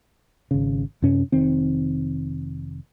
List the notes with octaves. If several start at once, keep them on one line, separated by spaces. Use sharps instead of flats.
G#1 C#3
F#2 C3 C#4
F1 D#3 C4